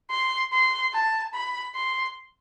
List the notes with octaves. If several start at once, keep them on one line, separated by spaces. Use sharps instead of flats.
C6
C6
A5
B5
C6